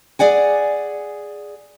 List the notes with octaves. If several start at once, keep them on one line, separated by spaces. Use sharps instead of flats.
G#4 D5 F#5 G#5